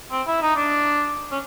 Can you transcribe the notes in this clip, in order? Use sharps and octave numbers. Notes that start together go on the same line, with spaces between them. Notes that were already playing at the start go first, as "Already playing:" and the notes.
C4
E4
D#4
D4
C#4